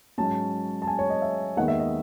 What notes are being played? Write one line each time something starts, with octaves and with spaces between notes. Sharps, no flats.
G#2 F#3 C#4 A5
A5
G#5
C#5
D#5
E5
D#2 D#3 G#3 B3 D#4 F#5
E5
D#5